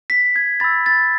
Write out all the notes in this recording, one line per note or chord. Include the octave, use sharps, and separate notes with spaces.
B6
G#6
B5 E6 A6
A6